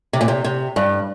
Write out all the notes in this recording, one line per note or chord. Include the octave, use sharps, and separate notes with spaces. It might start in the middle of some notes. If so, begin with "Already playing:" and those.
C3
A#2
C3
C3
G2